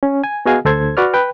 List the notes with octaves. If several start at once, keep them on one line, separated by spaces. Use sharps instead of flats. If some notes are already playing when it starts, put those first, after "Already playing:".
C#4
G#5
B3 F#4 G#4 D#5 F5 G#5
D2 A4 C5 G#6
F#4 B4 D5 C#6 F6
B4 G5